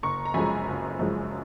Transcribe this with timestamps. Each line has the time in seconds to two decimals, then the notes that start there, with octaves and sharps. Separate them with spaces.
0.03 F#1 A#5 C#6
0.25 A#5
0.34 F#2 F3 G#3 G#5 B5
0.67 F#1
0.99 F#2 F3 G#3